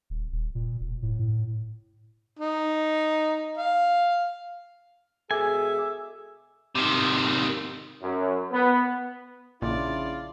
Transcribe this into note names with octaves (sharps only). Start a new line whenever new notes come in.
D#1
D#1
A#2
E1
A2
A2
D#4
F5
B2 G#3 G#4 A4 E5 G#5 D6 E6
C3 D#3
F#2
B3
A#1 C#3 D4 E4 F4 D5